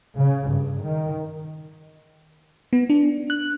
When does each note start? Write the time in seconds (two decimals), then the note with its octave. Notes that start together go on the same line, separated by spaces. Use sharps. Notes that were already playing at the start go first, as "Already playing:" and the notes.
0.17 C#3
0.51 G2
0.84 D#3
2.73 B3
2.90 D4
3.30 F#6